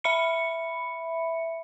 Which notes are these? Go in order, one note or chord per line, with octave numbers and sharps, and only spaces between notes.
E5 B5 C#7